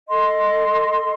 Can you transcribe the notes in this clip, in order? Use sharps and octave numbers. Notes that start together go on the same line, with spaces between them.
A4 D#5 C6